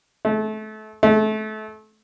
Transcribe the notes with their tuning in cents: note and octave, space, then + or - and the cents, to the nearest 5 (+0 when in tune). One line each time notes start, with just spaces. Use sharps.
A3 -30
A3 -30